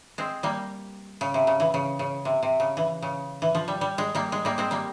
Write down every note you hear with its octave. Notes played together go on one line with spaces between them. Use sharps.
G#3 C4
G3 A#3
C#3
C3
C#3
E3
C#3
C#3
C3
C3
C#3
E3
C#3
E3
F3
G3
G3
G#3
G3 A#3
G#3
G3 A#3
G#3 C4
G3 A#3